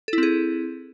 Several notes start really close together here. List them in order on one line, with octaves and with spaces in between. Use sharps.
A4 E4 C4 G#4